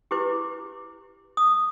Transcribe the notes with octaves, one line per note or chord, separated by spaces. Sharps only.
E4 G4 B4 D6
D#6